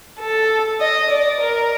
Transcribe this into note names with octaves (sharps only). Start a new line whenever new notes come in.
A4
D#5
D5
A#4